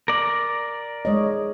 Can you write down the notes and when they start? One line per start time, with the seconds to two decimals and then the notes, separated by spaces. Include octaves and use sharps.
0.08 A#4 D5
1.05 G#3 C#5 D#5